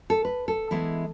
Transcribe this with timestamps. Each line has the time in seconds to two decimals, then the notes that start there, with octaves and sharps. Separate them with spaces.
0.10 A4
0.25 B4
0.48 A4
0.71 E3 G#3 B3 E4